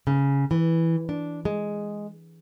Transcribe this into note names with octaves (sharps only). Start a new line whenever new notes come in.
C#3
E3
D4
G#3